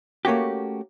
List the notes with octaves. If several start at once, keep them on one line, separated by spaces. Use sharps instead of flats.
A3 A#3 C#4 F#4 G4